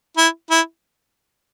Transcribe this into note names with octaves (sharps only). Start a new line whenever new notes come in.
E4
E4